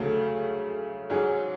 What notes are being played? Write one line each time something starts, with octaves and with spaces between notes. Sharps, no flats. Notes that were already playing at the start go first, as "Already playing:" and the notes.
Already playing: D2 C#3 F#3 A3
G#2 F#3 C#4 G#4